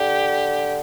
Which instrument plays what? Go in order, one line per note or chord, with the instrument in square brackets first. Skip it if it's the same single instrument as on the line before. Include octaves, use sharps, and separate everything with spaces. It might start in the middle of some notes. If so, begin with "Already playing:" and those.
Already playing: [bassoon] D3 [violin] G4